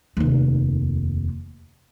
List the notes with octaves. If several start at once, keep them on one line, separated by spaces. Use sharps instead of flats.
F1 D#2